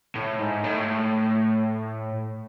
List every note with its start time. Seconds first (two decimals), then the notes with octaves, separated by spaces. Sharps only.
0.15 A2
0.39 G#2
0.64 A2